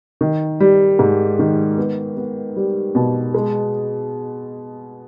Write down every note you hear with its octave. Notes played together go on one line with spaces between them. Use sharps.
D#3
G3
G#2
D#3
B3
B3
G3
B2
G#3